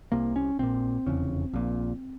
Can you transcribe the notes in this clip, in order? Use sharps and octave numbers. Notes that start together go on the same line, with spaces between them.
C2 C3 A#3
C#4
A#1 A#2 C4
F1 E2 C#3
A#1 A#2